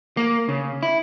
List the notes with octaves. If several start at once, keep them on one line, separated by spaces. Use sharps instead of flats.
A#3
C#3
E4